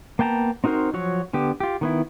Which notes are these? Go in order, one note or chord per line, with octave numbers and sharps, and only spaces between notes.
A#3 B3 G5 A5 A#5
C4 D#4 F#4 A#4 C5
F3 F#3 F#4 C#5
D3 B3 G4
F4 G4
D#3 B3 E4